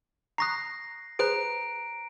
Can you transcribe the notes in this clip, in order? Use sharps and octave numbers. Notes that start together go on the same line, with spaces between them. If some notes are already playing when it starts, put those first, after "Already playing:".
A#5 C#6 D#6 F#6 A#6 C7
G#4 B4 C5 A#5 F#6 D7